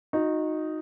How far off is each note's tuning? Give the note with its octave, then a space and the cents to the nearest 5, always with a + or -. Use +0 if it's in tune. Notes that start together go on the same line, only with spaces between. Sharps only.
D#4 +0 F#4 -30